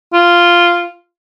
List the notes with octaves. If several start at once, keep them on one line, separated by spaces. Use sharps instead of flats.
F4